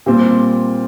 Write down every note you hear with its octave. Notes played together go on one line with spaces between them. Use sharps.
A#2 G3 C4